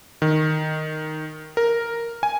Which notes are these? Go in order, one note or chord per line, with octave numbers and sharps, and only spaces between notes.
D#3
A#4
G#5